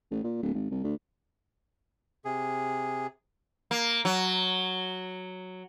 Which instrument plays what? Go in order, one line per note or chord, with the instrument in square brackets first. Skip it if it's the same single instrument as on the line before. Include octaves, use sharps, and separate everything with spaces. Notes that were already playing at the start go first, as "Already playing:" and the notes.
[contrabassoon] A1
A#2
D1
G#1
C2
D2
[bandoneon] C3 G#4
[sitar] A#3
F#3